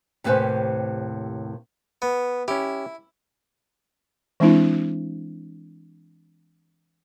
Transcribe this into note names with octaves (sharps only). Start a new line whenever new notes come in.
D#2 A2 C3 B4 C5 G#5
B3
C#4 E4 G4
E3 G#3 C4 D4 E4